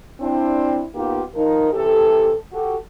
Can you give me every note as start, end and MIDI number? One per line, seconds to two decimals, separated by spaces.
0.20 0.83 60
0.20 0.83 62
0.20 0.83 64
0.95 1.21 58
0.95 1.21 59
0.95 1.21 63
0.95 1.21 65
0.95 1.21 67
1.34 1.68 53
1.34 1.68 63
1.34 1.68 70
1.72 2.33 48
1.72 2.33 52
1.72 2.33 67
1.72 2.33 69
2.53 2.75 66
2.53 2.75 67
2.53 2.75 69